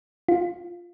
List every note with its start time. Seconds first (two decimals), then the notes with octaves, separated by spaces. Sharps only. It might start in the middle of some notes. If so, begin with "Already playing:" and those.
0.29 F4